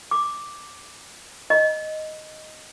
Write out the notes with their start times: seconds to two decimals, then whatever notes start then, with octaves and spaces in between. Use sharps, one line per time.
0.11 D6
1.50 D#5